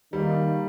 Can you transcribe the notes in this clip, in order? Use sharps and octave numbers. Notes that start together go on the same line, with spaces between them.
D#3 G3 A#3 D#4